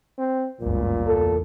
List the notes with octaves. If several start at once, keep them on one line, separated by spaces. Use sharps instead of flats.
C4
G1 C#2 F#2 A#2
E2 A4